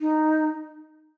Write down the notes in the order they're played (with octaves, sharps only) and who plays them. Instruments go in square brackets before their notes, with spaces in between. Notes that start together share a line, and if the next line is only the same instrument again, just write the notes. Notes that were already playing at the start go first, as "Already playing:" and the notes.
[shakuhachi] D#4